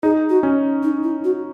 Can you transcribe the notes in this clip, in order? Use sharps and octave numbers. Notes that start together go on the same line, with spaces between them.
D#4 G#4
F#4
C#4
D#4
E4
F#4